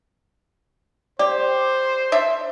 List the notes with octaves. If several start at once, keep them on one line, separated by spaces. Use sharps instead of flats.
G4 C5 D5
D4 E5